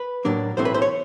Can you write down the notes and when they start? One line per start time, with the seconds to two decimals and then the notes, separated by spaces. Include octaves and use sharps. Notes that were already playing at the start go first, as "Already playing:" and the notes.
Already playing: B4
0.25 A2 F#3 A#3 D4
0.57 B1 A2 E3 A3 C4 C5
0.65 B4
0.74 C5
0.82 C#5